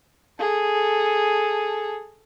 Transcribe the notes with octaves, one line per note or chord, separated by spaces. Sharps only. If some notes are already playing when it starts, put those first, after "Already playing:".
G#4 A4